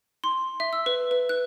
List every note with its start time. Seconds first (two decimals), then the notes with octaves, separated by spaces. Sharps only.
0.24 C6
0.60 E5
0.73 E6
0.86 B4
1.11 B4
1.29 F#6